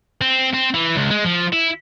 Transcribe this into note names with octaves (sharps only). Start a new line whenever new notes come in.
C4
C4
E3
C#2
G#3
F3
E4